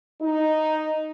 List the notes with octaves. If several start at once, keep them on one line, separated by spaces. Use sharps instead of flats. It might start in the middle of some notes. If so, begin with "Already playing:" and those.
D#4